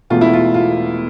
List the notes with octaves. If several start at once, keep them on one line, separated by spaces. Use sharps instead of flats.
E1 E2 B2 A3 F4
E4
F4
F4